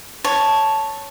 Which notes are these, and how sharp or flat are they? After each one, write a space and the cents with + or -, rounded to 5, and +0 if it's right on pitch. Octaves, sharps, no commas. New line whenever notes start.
C#5 +0 A5 +0 C#6 +0